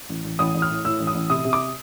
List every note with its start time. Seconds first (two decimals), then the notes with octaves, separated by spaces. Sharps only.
0.09 A1
0.24 A1
0.39 A1 D#6
0.55 A1
0.62 F6
0.69 A2
0.85 A2 E6
1.00 A1
1.07 D#6
1.15 A1
1.30 C3 D#6
1.45 C3
1.53 D6